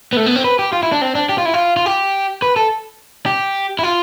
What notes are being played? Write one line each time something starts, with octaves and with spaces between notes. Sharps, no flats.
B3
A3
B3
C4
B4
G4
F4
E4
D4
C4
D4
G4
F4
E4
F4
F4
G4
B4
A4
G4
E4
F4